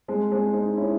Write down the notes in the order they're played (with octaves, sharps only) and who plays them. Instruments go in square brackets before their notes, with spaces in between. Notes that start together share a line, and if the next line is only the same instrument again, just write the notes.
[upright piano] G#3 C4
G#3 C4
C4 D#4
C#4 E4